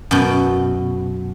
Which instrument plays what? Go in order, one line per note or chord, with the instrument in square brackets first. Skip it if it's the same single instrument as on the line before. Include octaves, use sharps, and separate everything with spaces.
[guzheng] F#2 B2